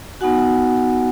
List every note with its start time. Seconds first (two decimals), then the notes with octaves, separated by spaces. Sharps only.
0.21 B3 D#4 F#4 F#5 G#5